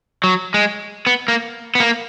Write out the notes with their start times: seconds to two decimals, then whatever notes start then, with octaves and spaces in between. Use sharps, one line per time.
0.24 F#3
0.54 G#3
1.07 B3
1.28 A#3
1.75 B3
1.80 A#3